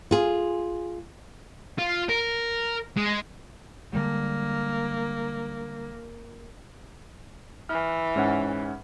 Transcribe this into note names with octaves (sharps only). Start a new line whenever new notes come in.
F4 G#4
F4
A#4
G#3
D3 G3 G#3 A#3
E3 F6
G#2 C#4 F#5